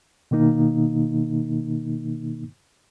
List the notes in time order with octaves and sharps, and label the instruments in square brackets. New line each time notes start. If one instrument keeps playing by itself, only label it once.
[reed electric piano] B2 D#3 A#3 D#4